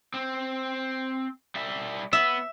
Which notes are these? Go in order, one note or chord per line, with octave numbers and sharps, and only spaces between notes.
C4
G3 E5
B3 E5